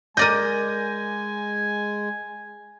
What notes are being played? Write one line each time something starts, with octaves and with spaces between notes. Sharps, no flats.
G#3 A#4 D5 D#5 G#5 G6 A#6 D#7